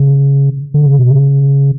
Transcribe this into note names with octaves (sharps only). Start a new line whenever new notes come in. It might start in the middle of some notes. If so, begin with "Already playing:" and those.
Already playing: C#3
D3
C#3
B2
C#3